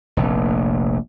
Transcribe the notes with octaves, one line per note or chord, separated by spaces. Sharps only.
F1 A#1